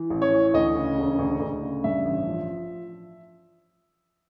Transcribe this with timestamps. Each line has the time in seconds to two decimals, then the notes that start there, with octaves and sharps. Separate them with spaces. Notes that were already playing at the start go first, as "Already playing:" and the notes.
Already playing: E3
0.10 A1
0.22 C#5
0.32 E3
0.54 D2 D#5
0.75 C#3
0.98 E1
1.19 D2
1.40 D2
1.62 C#3
1.84 G2 E5
2.05 A1
2.27 F3